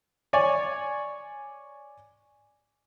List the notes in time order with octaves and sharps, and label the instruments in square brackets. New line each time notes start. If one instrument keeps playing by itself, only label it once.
[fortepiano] C#5 D5 G#5